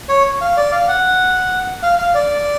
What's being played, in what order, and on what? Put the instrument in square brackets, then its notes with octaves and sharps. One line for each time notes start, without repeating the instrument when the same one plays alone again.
[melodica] C#5
F5
D5
F5
F#5
F5
F5
D5